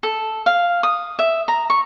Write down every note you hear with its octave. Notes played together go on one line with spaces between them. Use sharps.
A4
F5
D#6
E5
A#5
C#6